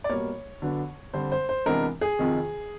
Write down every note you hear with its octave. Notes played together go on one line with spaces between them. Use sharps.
D5
B2 G3 A#3 C#5
D3 F#3 B3 D4
D3 G3 C4 C5
C5
C5
C3 E3 G#3 B3 D4 A#4
G#4
F2 C3 D#3